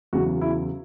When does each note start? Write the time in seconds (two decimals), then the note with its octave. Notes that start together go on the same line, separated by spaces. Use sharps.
0.13 E2 C#3 F#3 F#4
0.41 E4